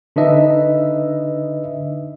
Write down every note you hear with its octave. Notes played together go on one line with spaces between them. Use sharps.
D3 D4 D#4 B4 D#5 E5